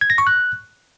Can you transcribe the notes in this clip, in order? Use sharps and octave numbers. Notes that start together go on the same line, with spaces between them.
G#6
A#6
C#6
F#6